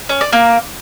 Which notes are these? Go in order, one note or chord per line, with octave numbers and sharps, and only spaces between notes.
C#4
D5
A#3